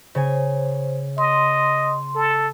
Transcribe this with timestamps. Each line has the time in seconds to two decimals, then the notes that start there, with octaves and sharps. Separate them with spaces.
0.15 C#3 C5 G#5
1.18 D#5 C6
2.15 A4